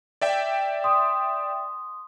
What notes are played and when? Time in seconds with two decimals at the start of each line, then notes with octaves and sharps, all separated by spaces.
0.22 D5 E5 G5
0.84 C6 D#6